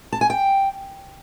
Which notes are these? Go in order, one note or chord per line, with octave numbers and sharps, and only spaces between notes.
A5
G#5
G5